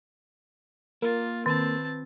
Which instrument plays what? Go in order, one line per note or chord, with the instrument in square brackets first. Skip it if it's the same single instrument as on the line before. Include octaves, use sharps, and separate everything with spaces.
[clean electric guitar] A#3 [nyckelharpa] F4 [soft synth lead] A#4
[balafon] D#3 [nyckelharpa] C4 A5 [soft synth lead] B4